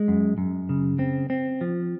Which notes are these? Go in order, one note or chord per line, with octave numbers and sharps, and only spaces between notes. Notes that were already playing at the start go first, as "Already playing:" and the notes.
Already playing: G#3
F#2
F#2
C#3
C4
C4
F3